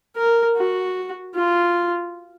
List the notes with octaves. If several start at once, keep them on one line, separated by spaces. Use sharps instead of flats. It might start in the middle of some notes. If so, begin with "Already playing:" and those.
A#4
F#4
F4